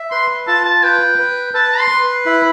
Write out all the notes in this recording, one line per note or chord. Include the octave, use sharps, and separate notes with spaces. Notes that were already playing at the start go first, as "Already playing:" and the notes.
Already playing: E5
B4 C6
F4 A5
A5
B4 G5
B4
B4 A5
C6
B4
E4 B5